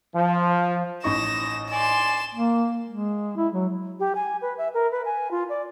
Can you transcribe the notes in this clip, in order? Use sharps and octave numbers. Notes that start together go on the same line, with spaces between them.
F3
A1 D#4 D#5 C#6 A#6 E7
D5 G#5 C6 E7
A#3
G#3
E4
F#3
G4
G#5
B4
E5
A#4
B4
G#5
F4
D5